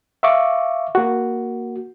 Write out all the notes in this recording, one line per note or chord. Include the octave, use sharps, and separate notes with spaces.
E5 F5 C#6 D6
A#3 F#4